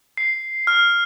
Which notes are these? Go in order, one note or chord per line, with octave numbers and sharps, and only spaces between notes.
C7
F6